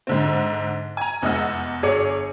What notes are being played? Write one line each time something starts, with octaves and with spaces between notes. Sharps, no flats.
G#2 D3 C4
G#5 A#5
F1 E2 G#3 D#5 F#5 E6
G1 G#4 C#5 D6 C#7